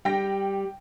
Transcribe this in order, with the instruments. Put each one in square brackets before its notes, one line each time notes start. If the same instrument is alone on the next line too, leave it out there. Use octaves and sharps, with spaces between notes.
[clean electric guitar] G3 [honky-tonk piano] G5 A#6